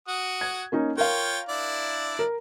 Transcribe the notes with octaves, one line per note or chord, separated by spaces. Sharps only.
F#4 F#5 D#6
G#6
A#3 C#4 D#4
F4 A#4 C#5 F5 G5
D4 E4 D5
A#4